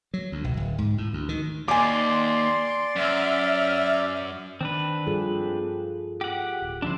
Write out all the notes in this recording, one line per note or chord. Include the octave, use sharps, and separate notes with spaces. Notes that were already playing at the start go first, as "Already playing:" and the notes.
F#3
D2
B1
D1
G#2
A2
D2
D#3
D#2 D5 G#5 C6 D6
F#2 E5 F6
D#3 C4 D4 B4
G2 G3 F4 G#4 A4
G4 F#5
D1
D3 F3 C#4 D4 E4 C5